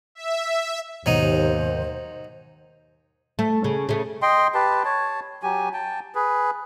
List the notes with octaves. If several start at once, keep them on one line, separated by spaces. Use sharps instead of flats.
E5
D#2 G#2 B2 D#3 F#3 D#4 C5
A3
C#3
C#3 A3
D#5 G5 C6
G4 B4 A5
C#5 A5
F#3 G4 G#5
G5 A5
G#4 B4